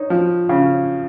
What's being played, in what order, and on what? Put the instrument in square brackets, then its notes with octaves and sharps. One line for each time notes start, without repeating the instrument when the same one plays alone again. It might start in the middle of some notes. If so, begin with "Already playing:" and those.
Already playing: [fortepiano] D#4 [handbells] C#5
[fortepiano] F3
C#3